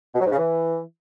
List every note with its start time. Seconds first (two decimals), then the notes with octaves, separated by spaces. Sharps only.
0.15 B2
0.20 F#3
0.26 G#2
0.32 C#3
0.38 E3